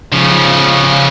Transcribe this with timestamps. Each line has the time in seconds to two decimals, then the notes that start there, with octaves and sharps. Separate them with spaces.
0.13 C#3 F3